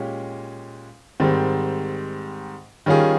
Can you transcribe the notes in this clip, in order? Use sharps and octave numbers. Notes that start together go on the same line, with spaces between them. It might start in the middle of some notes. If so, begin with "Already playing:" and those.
Already playing: A#2 G#3 C#4 G4
G#2 D#3 G3 C4
D#3 G3 C#4 F4 G#4